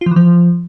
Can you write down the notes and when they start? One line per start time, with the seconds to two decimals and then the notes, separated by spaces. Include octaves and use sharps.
0.01 F4
0.06 F3
0.11 E3
0.16 F3